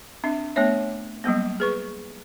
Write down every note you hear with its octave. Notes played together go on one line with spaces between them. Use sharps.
C4 D4 E5
A3 B3 D4 C#5 E5
F#3 G3 A#3 B3
G#4 B4 C#6